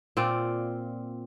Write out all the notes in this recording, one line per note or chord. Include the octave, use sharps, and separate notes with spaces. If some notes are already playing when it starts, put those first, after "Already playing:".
A#2 C4 F4 D5